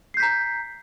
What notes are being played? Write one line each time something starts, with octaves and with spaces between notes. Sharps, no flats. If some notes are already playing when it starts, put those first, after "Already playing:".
A#5 G6 B6 C7